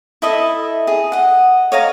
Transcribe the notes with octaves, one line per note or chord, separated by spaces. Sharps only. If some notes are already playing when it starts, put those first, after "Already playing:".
E4 A4 D#5 E5
G#4
D#5 F#5
C#5 D#5 F5 A#5